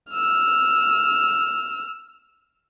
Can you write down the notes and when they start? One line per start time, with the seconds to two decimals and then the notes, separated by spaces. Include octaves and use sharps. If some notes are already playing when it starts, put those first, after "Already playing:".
0.13 E6 F6